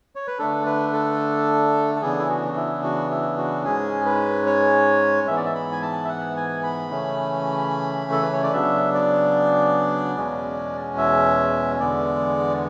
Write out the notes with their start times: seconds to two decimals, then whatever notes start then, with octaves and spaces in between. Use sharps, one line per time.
0.15 C#5
0.27 B4
0.39 D3 A3 D4 A4
0.66 B4
0.93 A4
1.96 A4
2.02 C#3 E3 B3 D4 G#4
2.19 E4
2.29 F#4
2.49 F#4
2.56 E4
2.83 F#4
3.11 E4
3.38 F#4
3.64 G#2 G#3 C#4 G#4
4.05 B4
4.46 C#5
5.27 G#2 E3 B3 E5
5.37 D5
5.46 E5
5.55 B5
5.72 G#5
5.82 A5
6.05 E5
6.09 F#5
6.36 G#5
6.63 B5
6.90 C#3 E3 A3 C#4
8.12 A4
8.22 B4
8.33 C#5
8.43 D5
8.53 C#3 F#3 B3 D4 E5
8.94 D5
10.17 E2 B2 G#3 C#4
10.98 E5
11.79 E2 D3 G#3 B3 D5